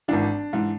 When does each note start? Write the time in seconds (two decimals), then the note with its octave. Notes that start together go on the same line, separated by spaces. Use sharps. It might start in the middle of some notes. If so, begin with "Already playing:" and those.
0.08 G#1 G#2 E3 D4
0.53 G#2 E3